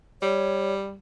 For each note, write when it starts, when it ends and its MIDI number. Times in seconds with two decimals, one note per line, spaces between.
0.22 0.96 55
0.22 0.74 73